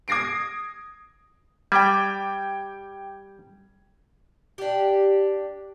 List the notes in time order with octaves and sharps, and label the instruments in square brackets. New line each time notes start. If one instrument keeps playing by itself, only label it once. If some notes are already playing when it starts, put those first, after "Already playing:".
[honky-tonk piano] D#6 G#6 A#6 C7 D7
[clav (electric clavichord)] G3 [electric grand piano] G5 D6 G#6
[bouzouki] D4 G4